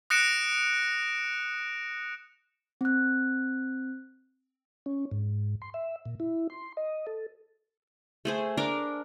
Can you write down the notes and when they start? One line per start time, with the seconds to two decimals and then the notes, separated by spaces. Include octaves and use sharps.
0.10 D#6 F#6 A#6 C#7 D7 E7
2.81 C4 F#6
4.86 C#4
5.11 G#2
5.62 C6
5.74 E5
6.05 A#2
6.20 E4
6.50 C6
6.77 D#5
7.07 A4
8.25 A3 G#4 C5
8.57 D4 A#4 D6